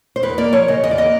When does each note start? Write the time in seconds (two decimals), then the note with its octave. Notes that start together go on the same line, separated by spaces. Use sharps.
0.16 C5
0.23 E2 B4
0.38 A#3 D5
0.53 F3 C#5
0.68 C#3 D#5
0.83 E2 D#5
0.91 D5
0.98 A#3 D#5